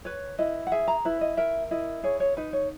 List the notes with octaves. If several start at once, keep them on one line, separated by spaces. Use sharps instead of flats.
B4 C#5
E4 D#5
F#5
G#4 E5
A#5
E4 B4
D#5
A#4 E5
E4 D#5
G#4 C#5
C#5
D#4 B4
C#5